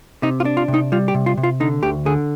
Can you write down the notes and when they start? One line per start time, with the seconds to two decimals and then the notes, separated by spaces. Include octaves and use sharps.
0.22 C3 D#4
0.40 F4
0.45 D4
0.57 F4
0.68 C3
0.74 D#4
0.92 G3 F4
1.08 G4
1.14 C3
1.26 F4
1.37 C3
1.43 F4
1.60 D3 D#4
1.82 D2 G4
2.06 D3 G#4